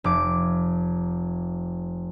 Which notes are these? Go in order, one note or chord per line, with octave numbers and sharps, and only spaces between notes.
F1 D6